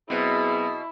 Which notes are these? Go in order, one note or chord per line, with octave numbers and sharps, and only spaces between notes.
B2 F#3 B3 C4 E4 G#4